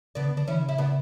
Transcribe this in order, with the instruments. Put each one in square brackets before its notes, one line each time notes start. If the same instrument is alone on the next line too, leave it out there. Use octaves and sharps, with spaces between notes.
[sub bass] C#3 [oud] B3 D4
[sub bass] D3
[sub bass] D3 [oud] D4
[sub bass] E3 [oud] C#4 E4
[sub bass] C#3
[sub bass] C#3 [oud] E4
[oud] B3 D4